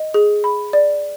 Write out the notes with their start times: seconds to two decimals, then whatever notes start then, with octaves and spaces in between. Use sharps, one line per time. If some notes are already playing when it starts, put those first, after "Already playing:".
Already playing: D#5
0.14 G#4
0.44 B5
0.73 D5